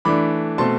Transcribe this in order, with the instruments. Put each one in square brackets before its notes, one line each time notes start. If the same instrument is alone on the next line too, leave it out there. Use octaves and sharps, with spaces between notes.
[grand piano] E3 A3 D4 B5 D6
B2 A3 C4 A5 C6